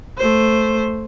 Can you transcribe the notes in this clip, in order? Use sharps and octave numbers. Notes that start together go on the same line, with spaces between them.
A3 C5